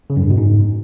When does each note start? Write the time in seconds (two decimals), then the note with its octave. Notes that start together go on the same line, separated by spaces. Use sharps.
0.10 C#3
0.17 F#2
0.24 G2
0.31 B2
0.37 G#2